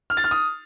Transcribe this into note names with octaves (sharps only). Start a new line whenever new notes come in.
F6
A6
F6
D#6